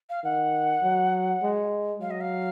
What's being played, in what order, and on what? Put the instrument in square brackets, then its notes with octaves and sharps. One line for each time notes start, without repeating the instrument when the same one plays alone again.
[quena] F5
[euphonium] D#3 [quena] F#5
[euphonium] F#3
G#3
[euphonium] F#3 [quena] F5
[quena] D#5
F5